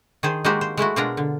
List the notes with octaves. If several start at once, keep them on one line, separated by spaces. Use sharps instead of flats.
D#3 G#4 C5
G#3 A#3 D#4 F#4 G4 C5
C5
G#3 A3 E4 F#4
B2 G#3 D4 F4 A#4 A#5
D3